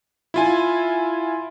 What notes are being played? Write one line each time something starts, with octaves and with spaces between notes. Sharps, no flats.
E4 F4 G#5